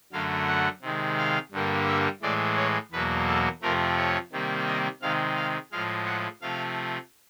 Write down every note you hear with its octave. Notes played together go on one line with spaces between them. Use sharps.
F#2 D3 F#3 A3 F5
F#5
C3 D#3 G#3
F5
G2 D3 G3 A#3
E5
A2 E3 G#3 D5
C#5
E2 B2 F#3 A#3 B4
A4
F2 C3 F3 A3 A#4
C#5
C3 D#3 G3 A#3
D#5
C3 D#3 G#3 F5
F5
A2 F3 G#3 F5
F#5
C3 F3 A3 F5